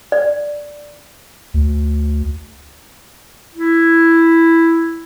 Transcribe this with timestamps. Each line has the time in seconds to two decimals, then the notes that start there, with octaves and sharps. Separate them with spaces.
0.12 D5
1.54 D2
3.55 E4